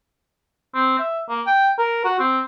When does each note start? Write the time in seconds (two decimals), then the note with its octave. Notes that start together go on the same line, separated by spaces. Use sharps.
0.75 C4
0.99 E5
1.29 A#3
1.46 G5
1.78 A#4
2.05 F#4
2.20 C4